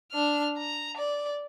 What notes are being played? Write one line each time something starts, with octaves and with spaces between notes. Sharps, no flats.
D4 F6
A#5
D5